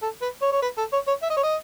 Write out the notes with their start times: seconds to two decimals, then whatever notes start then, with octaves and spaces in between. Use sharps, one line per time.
0.02 A4
0.22 B4
0.42 C#5
0.52 C#5
0.62 B4
0.78 A4
0.93 C#5
1.07 C#5
1.22 E5
1.30 D#5
1.37 C#5
1.43 D#5